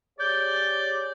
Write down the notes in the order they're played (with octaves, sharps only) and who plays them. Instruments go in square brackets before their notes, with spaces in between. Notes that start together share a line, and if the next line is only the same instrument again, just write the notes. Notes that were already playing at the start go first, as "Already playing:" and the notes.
[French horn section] G4 G#4 C#5 [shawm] D5 [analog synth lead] G6